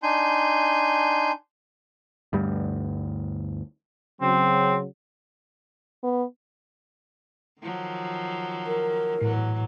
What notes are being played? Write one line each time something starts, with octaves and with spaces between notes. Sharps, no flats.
D4 D#4 G#5 C6 G6
D2 G2 G3
C#3 F#3 C4
B3
D#3 F3 F#3
A#4
E2 A2 E3 F#3